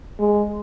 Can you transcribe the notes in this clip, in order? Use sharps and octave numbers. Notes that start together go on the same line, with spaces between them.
G#3